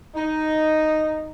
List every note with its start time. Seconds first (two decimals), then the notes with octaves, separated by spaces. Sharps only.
0.15 D#4